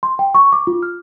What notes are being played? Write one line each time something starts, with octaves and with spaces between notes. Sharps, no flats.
C6
G5
C#6
D6
F4
F6